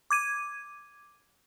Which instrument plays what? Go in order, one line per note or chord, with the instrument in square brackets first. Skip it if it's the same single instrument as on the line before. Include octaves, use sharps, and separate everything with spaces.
[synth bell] D6 G#6 D#7